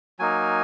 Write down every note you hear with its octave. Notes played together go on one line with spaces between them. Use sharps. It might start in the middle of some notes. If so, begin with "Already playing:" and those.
F#3 A#3 D#4 G#5